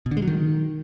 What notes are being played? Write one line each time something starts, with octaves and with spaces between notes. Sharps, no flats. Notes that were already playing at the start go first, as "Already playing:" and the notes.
B2
D3
G#3
F#3
D#3